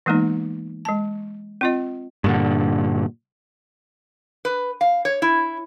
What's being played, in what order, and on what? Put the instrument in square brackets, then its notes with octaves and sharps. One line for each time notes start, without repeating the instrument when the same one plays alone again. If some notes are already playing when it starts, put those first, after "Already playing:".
[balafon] E3 G#3 A#3 B3 D#4
G#3 A5
C4 F4 D#5
[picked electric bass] G2 A#2 D3
[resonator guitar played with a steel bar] B4
F5
C#5
E4